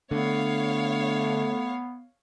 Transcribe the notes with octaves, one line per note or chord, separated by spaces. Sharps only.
D3 A3 B3 C#5 F5